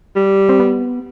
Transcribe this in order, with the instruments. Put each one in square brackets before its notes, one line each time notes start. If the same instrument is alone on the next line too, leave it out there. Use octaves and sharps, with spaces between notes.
[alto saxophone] G3
[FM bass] C4
B3